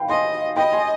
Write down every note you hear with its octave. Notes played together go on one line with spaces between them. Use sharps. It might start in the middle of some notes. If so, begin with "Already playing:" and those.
Already playing: F5 G5 B5
D#5 G#5 C6
D#5 G5 B5
G#5 C6